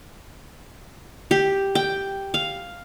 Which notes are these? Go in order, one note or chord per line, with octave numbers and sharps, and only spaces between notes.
G4
G5
F5